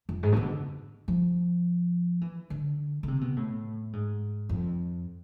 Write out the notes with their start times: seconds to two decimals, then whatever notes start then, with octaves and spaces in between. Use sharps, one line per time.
0.09 F2
0.23 G#2
0.32 B2 E3
0.41 D3
1.08 F3
2.21 E3
2.50 D3
3.03 D3
3.08 C3
3.21 B2
3.36 A2
3.93 G#2
4.49 F2